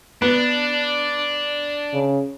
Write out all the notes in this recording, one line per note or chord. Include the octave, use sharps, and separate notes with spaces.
B3 D4
C#3